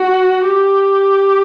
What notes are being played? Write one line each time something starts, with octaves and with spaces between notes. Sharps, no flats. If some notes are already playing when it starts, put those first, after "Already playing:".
Already playing: F#4
G4